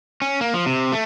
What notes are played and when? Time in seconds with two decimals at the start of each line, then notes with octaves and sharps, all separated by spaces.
0.22 C#4
0.41 A#3
0.54 F3
0.66 C3
0.92 A3